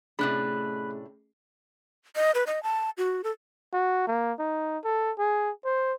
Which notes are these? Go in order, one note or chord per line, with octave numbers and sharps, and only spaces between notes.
A2 C3 A3 C#4 D4 G#4 B5 F#6
D#5
B4
D#5
A5
F#4
A4
F#4
A#3
D#4
A4
G#4
C5